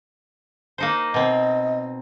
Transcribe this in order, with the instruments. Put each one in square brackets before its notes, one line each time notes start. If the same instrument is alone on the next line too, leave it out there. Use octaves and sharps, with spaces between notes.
[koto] A#3 D#4 C5
[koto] B2 C4 [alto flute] D#5